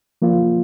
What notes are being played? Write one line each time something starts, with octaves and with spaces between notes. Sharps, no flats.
F3 A#3 F4